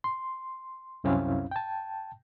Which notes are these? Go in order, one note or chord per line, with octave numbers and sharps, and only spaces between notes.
C6
C2 F#2 C4 C#4 E4 F5
G5 A5